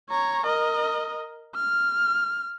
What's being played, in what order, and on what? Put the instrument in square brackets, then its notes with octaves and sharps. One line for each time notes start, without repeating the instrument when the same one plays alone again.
[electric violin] C#5 A#5
A#4 D#5
F6